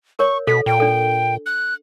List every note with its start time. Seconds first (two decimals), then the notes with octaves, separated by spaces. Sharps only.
0.19 A#4 C#5 C#6
0.47 B2 A4 B6
0.66 A#2 G5
0.80 D4 A4
1.46 F#6